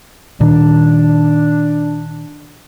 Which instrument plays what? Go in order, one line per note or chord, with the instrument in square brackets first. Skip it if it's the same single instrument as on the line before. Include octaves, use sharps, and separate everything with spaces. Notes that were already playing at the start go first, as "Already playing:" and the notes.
[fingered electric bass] A#2 D#3 [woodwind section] D4